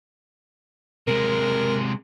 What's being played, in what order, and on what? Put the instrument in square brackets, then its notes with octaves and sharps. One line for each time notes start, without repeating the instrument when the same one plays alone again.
[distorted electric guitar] C3 G#3 [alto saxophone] A#4